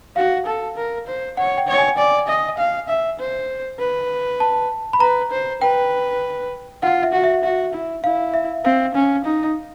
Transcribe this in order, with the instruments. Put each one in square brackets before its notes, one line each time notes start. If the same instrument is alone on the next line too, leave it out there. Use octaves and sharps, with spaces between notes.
[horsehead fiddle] F#4 [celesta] F5
[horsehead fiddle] A4
A#4
C5
[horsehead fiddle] C#5 [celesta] F#5
[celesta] G5
[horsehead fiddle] C#5
[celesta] G#5
[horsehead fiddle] D5 [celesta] G#5
[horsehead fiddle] D#5
F5
E5
C5
B4
[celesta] A5
B5
[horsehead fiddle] B4 [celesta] A#5
[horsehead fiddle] C5
[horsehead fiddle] B4 [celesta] G5
[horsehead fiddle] F4 [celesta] F#5
[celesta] E5
[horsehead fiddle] F#4
[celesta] E5
[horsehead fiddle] F#4 [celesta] E5
[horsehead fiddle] E4
[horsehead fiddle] E4 [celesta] F5
[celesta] E5
[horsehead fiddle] C4 [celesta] F5
[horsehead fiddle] C#4
D#4